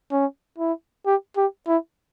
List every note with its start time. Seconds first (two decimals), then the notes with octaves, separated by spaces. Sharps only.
0.12 C#4
0.58 E4
1.06 G4
1.37 G4
1.67 E4